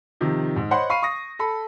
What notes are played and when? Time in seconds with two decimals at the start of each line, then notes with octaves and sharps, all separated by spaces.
0.21 C3 D#3 F3
0.56 G#2
0.71 C5 C#5 D#5 F#5 B5 C6
0.90 F5 B5 C#6 C7 D#7
1.03 C#6 D#6 A#6
1.39 A4 A5 B5